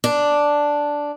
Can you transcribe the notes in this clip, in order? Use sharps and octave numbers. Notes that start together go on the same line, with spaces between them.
D4